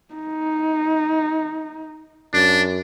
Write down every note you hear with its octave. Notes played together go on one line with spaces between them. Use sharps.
D#4
F#2 D4